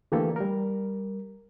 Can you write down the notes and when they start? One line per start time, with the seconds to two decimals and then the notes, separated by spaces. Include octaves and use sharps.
0.12 D3 E3 A3 A#3 G4 A4
0.36 G3 A#4